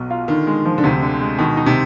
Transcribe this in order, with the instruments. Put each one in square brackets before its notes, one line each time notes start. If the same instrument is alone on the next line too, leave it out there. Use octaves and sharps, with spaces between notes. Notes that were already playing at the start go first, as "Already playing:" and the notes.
Already playing: [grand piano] B1 B2
F4
[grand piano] D3 [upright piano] D#3
[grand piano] G#3
F3
[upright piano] D3
[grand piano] D2 [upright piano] C3
[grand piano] D3
G#3
[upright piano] B2 [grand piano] D#3
[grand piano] D#4
[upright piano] C3